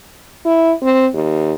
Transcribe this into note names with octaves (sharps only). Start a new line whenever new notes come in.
E4
C4
D#2